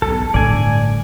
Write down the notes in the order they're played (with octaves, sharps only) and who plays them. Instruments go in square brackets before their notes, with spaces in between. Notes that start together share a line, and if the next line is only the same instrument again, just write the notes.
[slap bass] B1 E2 G#2 [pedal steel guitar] A4
[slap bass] G1 C3 D4 [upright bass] A2 [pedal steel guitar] D5 G#5